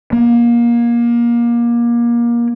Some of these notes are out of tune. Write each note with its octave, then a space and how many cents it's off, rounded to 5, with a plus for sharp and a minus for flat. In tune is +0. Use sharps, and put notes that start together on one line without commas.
A#3 +25